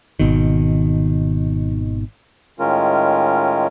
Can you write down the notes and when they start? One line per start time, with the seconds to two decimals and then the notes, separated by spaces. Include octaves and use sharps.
0.19 G#1 B2 D#3
2.60 A2 D#3 G#3 C#4 F4 A#4